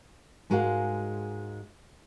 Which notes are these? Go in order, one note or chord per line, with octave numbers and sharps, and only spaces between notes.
G#2 G#3 F#4 A#4 F5 F#5